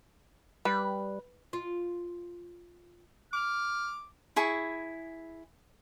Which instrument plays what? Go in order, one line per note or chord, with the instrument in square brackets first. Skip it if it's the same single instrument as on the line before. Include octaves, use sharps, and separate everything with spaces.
[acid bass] G3 [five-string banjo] B4
[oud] F4
[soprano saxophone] D6 [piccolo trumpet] F6
[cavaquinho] E4 G#4 C#6